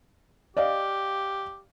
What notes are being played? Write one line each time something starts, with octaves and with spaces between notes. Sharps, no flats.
G4 D5 D#5 F5